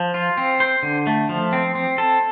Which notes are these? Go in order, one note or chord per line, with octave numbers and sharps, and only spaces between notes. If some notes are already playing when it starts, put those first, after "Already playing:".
Already playing: F3
F4
C4
C5
D3
A3
F3
C4
C4
A4